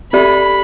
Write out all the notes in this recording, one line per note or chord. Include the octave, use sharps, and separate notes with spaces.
C4 G4 D5 B5